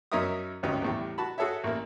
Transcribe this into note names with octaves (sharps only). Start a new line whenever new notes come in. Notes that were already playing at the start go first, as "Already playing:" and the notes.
F#2 C#4 D#4 A#4 E5 D#6
G#1 D2 D#3 C#4 D#4 G4
E2 A2 G3
F#4 A5 B5
F#4 G#4 A4 C#5 E5
A1 A#3 E4